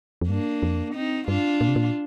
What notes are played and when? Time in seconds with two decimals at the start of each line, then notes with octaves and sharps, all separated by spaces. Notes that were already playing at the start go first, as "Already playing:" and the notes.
0.21 F2
0.29 G2 A#3 D4
0.63 F2
0.94 C4 D#4
1.28 G2 D4 F4
1.61 A#2
1.68 C3
1.76 A#2